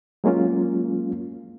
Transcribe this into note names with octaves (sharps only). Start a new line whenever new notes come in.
F#3 G#3 A#3 C#4 F4